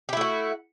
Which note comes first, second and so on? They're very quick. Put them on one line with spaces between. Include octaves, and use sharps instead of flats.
G4 E4 A3 F#4